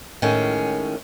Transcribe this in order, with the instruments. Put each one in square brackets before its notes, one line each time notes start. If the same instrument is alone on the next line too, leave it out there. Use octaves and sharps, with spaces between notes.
[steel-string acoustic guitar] A2 D#3 G#3 C#4